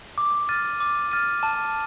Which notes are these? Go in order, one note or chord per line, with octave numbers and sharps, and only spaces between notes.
D6
F6 A6 D#7
D6
F6 A6 D#7
A5